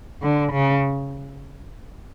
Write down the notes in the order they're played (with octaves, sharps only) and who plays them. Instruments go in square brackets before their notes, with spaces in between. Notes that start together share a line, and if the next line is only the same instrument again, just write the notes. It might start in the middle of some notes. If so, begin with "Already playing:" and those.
[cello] D3
C#3